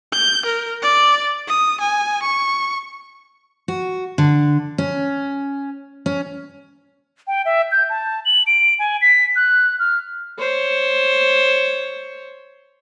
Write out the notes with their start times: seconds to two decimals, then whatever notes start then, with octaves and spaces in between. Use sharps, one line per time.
0.12 G6
0.46 A#4
0.82 D5
1.48 D#6
1.81 G#5
2.23 C#6
3.68 F#4
4.18 D3
4.78 C#4
6.06 C#4
7.27 G5
7.45 E5
7.72 G6
7.90 A5
8.25 F#7
8.47 D7
8.79 G#5
9.02 B6
9.36 F#6
9.79 F6
10.39 C5 C#5